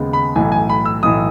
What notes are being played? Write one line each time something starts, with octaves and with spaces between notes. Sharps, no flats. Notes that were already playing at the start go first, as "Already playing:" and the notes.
Already playing: D#2 C#3 G#3 B3
B5
B1 A2 E3 G#5
G#5
B5
E6
B1 A2 E3 D#6